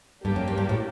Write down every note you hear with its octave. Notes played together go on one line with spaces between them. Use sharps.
G2 A#3 D4 G4
F#2
G2
G2
A2